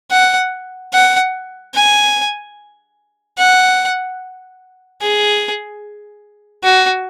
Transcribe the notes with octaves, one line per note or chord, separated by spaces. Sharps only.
F#5
F#5
G#5
F#5
G#4
F#4